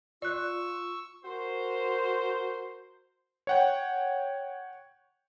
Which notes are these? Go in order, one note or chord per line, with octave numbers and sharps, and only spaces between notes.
F4 D5 C#6 E6 F#6
F#4 A#4 C5
C#5 F#5 G5